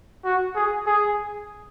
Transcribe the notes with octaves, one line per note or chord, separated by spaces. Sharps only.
F#4
G#4
G#4